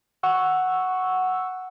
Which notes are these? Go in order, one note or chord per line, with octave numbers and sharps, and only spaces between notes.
F#5 C#6 E6